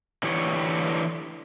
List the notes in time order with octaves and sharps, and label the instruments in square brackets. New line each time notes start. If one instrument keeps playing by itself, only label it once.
[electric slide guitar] D3 E3 G4 C#5